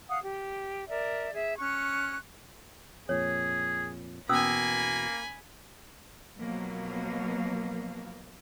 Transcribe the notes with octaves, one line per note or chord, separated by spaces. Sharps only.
F5 F#5 D#6
G4
A#4 D5 E5
G#4 E5
C#4 C#6 F#6
F2 A#2 G#4 C#5
E2 B2 A#3 C#4 G#5 B5 D#6 E6
B2 F3 F#3 A#3